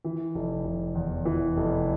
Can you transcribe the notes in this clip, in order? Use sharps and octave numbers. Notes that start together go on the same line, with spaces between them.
E3
F1
F1
E2
E3
F1